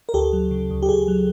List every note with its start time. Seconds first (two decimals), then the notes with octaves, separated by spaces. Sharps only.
0.09 A#4
0.14 D2 G4 A4
0.33 F#3
0.51 C#3
0.70 D2
0.83 G4
0.89 D2 G#4
1.08 F#3